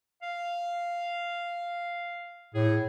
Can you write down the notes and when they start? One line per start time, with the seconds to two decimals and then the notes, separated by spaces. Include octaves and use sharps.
0.22 F5
2.55 A2 G#4